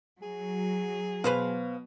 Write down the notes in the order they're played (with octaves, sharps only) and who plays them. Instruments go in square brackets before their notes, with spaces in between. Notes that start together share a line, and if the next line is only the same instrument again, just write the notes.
[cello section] F#3 [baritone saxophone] G#4
[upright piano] B2 [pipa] B4 C5 F5